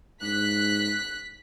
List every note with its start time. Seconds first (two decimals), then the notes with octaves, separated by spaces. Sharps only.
0.22 G#2 F#6 B6